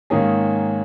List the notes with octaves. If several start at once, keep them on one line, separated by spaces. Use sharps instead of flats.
G#2 D#3 A#3 C#4 G#4